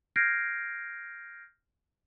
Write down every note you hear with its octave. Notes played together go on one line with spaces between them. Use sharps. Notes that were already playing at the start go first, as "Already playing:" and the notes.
F6 G6 G#6 A#6 C7 D7